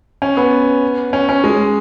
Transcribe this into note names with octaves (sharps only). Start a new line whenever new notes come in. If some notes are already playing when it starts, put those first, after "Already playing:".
C#4
B3
C#4
C#4
G#3